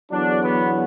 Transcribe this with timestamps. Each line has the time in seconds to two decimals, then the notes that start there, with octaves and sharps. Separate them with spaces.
0.12 E2 D3 F#3 D4
0.43 B3